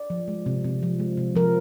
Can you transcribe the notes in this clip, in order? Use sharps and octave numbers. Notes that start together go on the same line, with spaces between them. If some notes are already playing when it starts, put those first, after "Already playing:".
Already playing: D5
F3
G#3
C3
C3
F3
G#3
C3
F3 A#4